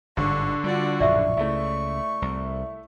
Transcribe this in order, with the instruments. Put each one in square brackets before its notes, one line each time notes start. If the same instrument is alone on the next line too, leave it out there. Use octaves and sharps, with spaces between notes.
[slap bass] G1 G#2 [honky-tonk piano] D3 [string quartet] C#6
[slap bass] G3 [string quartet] F4 F#4 D5
[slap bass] A#1 F#2 A2 [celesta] D5 E5 [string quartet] C#6
[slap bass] C#2 C#3 [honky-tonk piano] A3 E4
[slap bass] C2